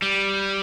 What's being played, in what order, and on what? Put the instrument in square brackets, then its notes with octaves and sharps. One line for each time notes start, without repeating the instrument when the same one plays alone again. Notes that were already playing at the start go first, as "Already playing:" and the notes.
[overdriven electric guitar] G3